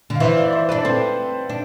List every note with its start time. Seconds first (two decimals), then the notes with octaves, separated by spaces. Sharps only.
0.10 D3
0.15 F5
0.20 E3 C5 E5
0.36 D5 F5
0.53 C5 E5
0.69 D4 B4 D5
0.85 C4 A4 C5
1.50 D4